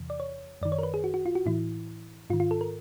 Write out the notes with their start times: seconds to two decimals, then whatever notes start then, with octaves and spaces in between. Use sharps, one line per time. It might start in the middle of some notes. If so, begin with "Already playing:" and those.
Already playing: E2 C3 E3
0.10 D5
0.20 C#5
0.62 F#2 D#3 D5
0.72 C#5
0.79 A#4
0.83 B4
0.94 G#4
1.04 F#4
1.14 F#4
1.26 F4
1.35 F#4
1.46 A2 E3 E4
2.30 G#2 F4
2.33 D#3
2.40 F4
2.51 A4
2.61 A#4